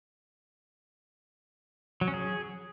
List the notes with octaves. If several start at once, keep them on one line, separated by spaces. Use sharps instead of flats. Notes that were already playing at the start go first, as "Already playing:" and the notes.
F#3
C#4
G#4